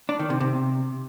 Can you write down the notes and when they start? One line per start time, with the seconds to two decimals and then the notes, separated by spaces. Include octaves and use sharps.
0.09 D4
0.19 D#3
0.30 C3
0.40 C3